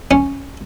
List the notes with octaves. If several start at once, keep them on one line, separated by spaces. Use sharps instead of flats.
C#4